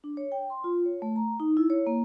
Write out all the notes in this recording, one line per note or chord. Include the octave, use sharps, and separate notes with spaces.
D4
C#5
G5
C6
F4
C#5
A3
A#5
D#4
E4
C#5
A#3